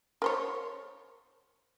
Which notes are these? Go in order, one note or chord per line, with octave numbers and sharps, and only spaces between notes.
A#4 C5 C#5